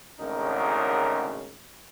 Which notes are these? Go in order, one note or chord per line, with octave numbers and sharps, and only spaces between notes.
G#1 D2 C#3 C#4 D#4 A#4